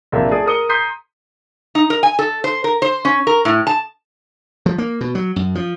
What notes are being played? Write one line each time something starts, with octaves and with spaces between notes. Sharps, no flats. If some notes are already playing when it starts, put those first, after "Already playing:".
A#1 C3 A#3 D4 E5
A3 G#4 D5 D#6
A#4 C5 D#6 C#7 G7
A#5 C6 D#6 G6 B6 C7
D#4
A#4
G#5
A4
C5
A#4
C5
C#4
A#4
A2
A5
F3
A#3
B2
F#3
F#2
F3